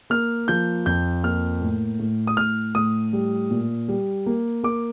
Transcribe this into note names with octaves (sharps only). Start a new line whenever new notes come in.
A#3 F6
F3 G6
F2 G6
A#3 F6
A2
A2
D#6
A2 F6
A2 D#6
G3
A#2
G3
A#3
A#3 D6